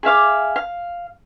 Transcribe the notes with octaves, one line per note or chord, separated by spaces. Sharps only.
G#4 E5 F5 D6
F5